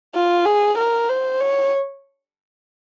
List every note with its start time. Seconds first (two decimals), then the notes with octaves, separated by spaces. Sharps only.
0.15 F4
0.46 G#4
0.78 A#4
1.09 C5
1.41 C#5